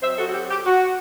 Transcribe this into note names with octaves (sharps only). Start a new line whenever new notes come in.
F#3 C4 D#4 C5 E5
F#4 A4
F#4
G4
G4
F#4